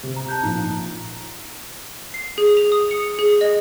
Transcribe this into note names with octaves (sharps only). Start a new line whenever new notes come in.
C3 G4
A#5
A5 F#6 G6
A#1 F3 D#4 A#5
C7
G#4
F7
D#6
C#7
G#4
D#5